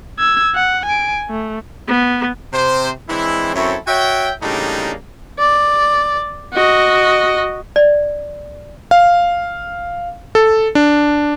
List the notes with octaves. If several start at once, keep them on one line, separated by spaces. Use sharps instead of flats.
E6 G#6
F#5
G#5 D7
A3
B3
C3 C5
E3 G#3 C4 D4 E4
F#2 C4 E4 A4 C#5
F#4 C#5 E5 G5
A2 C#3 G3 A#3 D4 D#4
D5
F#4 D#5
D5
F5
A4
D4